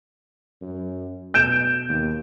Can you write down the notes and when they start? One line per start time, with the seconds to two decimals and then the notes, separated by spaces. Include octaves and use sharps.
0.62 F#2
1.34 B2 G6 D7 E7
1.89 D#2